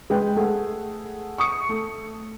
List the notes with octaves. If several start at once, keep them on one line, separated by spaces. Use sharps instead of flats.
G#3 B4 G5
A3 G#4 F#5
C#6 D#6 C#7
A3